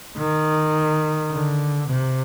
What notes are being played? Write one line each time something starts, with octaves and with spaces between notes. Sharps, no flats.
D#3
D3
C3